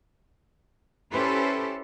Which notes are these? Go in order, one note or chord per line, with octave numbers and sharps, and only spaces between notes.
C#4 E4 G4 A4 B4 C5